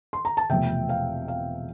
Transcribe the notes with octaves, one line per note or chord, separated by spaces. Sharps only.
C6
A#5
A5
E1 E2 C3 F3 A3 E5 G5
F5
F5